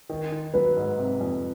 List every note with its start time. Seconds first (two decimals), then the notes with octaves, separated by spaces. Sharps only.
0.10 D#3
0.32 D#3
0.54 F#3 B4
0.76 G#2
0.99 C3
1.21 F2